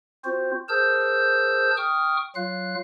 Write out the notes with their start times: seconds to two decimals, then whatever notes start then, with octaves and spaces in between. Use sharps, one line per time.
0.25 C4 F4 F#4 C5
0.69 G#4 A#4 C5 A5 E6 G6
1.77 G5 C#6 D#6 F6
2.36 F#3 F4 F5 F#6